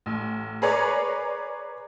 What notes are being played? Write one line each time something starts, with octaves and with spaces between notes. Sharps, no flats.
A1
G#4 A#4 B4 C#5 D5 A#5